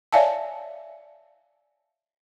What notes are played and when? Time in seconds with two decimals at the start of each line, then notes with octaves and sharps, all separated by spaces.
0.12 C#5 D5 E5 F5 G#5 A5